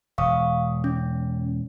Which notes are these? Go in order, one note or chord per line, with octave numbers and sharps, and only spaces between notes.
E1 F5 C#6 D#6
C#4